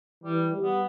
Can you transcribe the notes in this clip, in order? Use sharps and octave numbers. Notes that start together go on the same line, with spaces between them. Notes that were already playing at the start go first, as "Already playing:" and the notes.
E3 G3
G3
B3